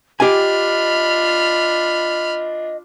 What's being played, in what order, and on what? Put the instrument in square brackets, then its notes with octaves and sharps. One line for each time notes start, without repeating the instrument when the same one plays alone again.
[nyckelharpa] D4 F4 [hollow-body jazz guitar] G4 G#5 [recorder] D#5 [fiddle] B5 F6